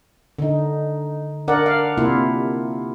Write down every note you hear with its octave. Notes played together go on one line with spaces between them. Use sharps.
D3 D#4
D4 A#4 D5 F#5
F5
C3 A#3 E4 F4